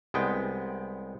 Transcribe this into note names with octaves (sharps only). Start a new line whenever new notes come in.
C2 G#3 B3 G5